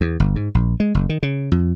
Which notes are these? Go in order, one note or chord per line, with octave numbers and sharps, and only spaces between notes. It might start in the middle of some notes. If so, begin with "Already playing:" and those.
E2
G1
G#2
A#1
G#3
F#1
D#3
C#3
F2